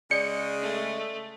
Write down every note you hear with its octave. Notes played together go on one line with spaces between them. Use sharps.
C#3 G#3 D5 C#7
A3